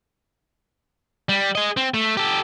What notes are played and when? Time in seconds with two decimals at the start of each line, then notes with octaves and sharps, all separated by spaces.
1.29 G3
1.55 G#4 D#5
1.77 C4
1.94 A3
2.17 G4 A4